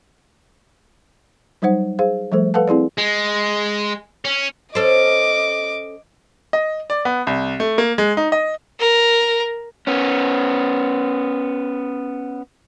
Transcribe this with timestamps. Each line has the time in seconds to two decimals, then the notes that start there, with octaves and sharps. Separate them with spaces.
1.62 F#3 G3 D#4 C5 F#5
1.99 G#4 C5 F5
2.32 F3 G3 A3 A4 C5
2.54 A4 B4 F5 F#5 A5
2.68 C4 E4 G#4 D5
2.98 G#3
4.25 C#4
4.75 C#4 A4 C5 D#5 D6
6.53 D#5
6.90 D5
7.05 B3
7.27 C2
7.60 A3
7.78 A#3
7.98 G#3
8.17 D#4
8.32 D#5
8.79 A#4
9.87 B3 C#4